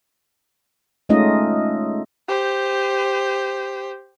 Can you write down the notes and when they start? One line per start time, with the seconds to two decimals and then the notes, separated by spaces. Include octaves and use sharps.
1.09 G#3 A3 C#4 D#4 F4 D#5
2.28 G4 C5